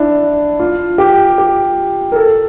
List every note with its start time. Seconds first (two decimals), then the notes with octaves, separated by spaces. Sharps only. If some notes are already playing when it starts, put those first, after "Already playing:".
Already playing: D4 E4
0.60 F4
0.98 G4
1.38 G4
2.12 A#4
2.16 A4